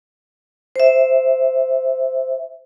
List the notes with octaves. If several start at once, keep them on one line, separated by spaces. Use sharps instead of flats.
C5 E5